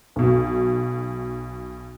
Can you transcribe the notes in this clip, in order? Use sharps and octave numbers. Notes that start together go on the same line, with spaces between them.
B1 B2